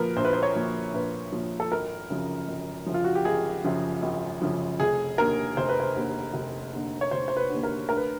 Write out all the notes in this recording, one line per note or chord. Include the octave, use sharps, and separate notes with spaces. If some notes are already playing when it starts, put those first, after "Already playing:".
Already playing: A#2 F3 A#4 B4
A#1 C5
B4
C5
C#5
A#2 F3
A#1 B4
A#2 F3
A4
G#1 A#4
F#2 C#3 F3
G#1
F#2 C#3 F3
F4
F#4
G4
G#1 G#4
F#2 C#3 F3
G#1
F#2 C#3 F3
F1 G#4
D#2 D3 A#4
F1 C5
B4
C5
D#2 D3
F1
D#2 D3
C#5
F1 C5
C5
B4
D#2 D3
A#4
D2 A#4
B4